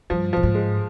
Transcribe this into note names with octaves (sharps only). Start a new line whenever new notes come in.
G2 F3
A2 F3
G#2
G#3